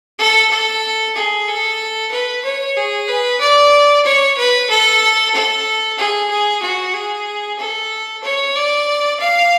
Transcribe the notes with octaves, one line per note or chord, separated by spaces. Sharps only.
A4
A4
G#4
A4
B4
C#5
G#4
B4
D5
C#5
B4
A4
A4
G#4
G#4
F#4
G#4
A4
C#5
D5
F5